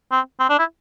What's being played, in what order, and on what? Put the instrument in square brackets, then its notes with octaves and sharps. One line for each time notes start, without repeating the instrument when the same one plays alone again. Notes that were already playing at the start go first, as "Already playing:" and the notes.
[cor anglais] C4
C4
D4
E4